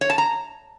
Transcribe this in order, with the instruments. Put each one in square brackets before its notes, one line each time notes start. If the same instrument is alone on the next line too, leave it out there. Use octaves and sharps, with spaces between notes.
[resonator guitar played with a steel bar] C#5
A5
A#5